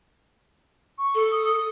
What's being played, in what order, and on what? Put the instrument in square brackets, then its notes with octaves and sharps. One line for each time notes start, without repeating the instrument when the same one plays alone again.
[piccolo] C#6
[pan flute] A4
[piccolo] D#6